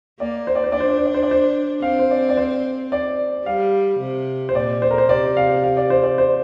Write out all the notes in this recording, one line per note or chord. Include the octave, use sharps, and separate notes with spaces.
A#3 D5
C5
D5
C5
D4 D5
C5
D5
C5
D5
C5
D5
C5
C4 F5
C5
D5
D5
C5
D5
G3 F5
C3
C5
A#2 D5
C5
A#4
C5
C3 D5
F5
F5
D5
C5
D5
C5